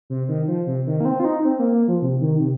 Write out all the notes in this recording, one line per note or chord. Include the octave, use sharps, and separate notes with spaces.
C3
D#3
F3
C3
D#3
A#3
C4
F4
D#4
C4
A#3
A#3
F3
C3
D#3
C3